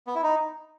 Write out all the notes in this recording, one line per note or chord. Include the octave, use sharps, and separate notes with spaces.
B3
E4
D#4